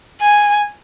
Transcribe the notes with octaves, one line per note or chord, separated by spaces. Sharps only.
G#5